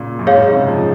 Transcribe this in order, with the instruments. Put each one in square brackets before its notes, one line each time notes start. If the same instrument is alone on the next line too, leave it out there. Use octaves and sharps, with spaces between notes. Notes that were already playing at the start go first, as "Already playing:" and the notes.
Already playing: [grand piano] A#2 C#3
F#2
[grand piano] G#2 [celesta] G#4 C#5 F5
[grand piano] G#2
C3
C#3
F3